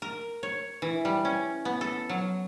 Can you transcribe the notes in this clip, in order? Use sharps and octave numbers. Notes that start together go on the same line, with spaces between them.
A#4
C#5
E3
G3
C#4
B3
A4
F#3